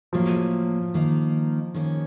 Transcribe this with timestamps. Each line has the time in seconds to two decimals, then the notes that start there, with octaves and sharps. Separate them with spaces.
0.13 A2 F3 F#3 A#3
0.94 D#3 A#3 D#4
1.74 D#3 A#3 C#4